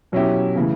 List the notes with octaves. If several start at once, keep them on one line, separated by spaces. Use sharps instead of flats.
B2 F#3 C#4 E4 G4
C#3 E3 A3